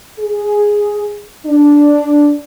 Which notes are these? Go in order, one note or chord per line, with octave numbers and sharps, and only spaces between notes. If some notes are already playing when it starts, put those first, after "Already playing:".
G#4
D4